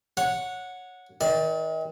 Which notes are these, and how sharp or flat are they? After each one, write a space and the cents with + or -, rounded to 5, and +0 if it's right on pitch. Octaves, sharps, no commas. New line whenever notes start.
C#5 +0 F#5 -15
D#3 +40 D5 +0